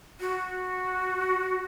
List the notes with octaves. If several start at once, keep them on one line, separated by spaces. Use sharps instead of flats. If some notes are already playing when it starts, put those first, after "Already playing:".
F#4